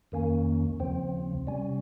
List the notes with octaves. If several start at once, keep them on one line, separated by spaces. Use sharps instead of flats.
F2 D#3 A#3 C#4
D#2 C#3 F3 C4
C3 G3 C#4